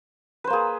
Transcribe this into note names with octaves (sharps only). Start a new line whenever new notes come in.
A#3 G#4 B4 C5